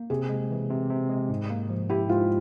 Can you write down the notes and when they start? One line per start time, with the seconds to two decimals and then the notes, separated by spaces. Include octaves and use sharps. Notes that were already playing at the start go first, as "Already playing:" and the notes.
Already playing: A#3
0.10 C3 G#4
0.29 G#3
0.51 E3
0.70 C3
0.90 C3
1.09 G#3
1.29 G#2
1.50 A#3
1.69 F3
1.90 E4 G4
2.09 G#2 F4